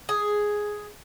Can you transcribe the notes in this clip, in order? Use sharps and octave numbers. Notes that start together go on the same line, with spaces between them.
G#4